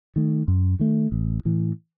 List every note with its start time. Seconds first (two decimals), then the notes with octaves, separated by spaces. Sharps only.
0.16 D#3 A3
0.48 F#2
0.79 D#3 A3
1.12 A1
1.45 A2 E3